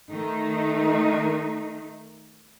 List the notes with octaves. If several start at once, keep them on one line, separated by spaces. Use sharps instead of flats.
D#3 A3 D#4